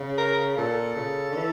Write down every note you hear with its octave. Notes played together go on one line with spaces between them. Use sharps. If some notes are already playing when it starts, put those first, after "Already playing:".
Already playing: C#3
A#4
A#2 A4
C#3
D3
E3